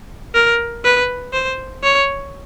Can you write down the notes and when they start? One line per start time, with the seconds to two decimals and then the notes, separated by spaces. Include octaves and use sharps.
0.34 A#4
0.84 B4
1.33 C5
1.83 C#5